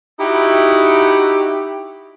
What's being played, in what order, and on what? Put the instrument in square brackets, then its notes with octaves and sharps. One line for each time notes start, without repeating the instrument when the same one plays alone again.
[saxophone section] D#4 E4 F#4 G4